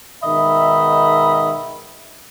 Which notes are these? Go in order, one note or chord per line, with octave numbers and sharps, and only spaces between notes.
G#2 B2 D#3 D#5 E5 B5